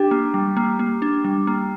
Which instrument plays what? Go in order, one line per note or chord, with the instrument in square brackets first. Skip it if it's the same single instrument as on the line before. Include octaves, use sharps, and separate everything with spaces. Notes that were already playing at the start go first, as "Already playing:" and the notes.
Already playing: [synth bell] D4 [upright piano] G4
[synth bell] A#3
G3
A#3
A#3
D4
G3
A#3